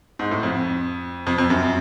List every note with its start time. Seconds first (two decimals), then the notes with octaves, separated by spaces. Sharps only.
0.19 G#2
0.31 A2
0.43 F2
1.27 F2
1.38 F2
1.50 F#2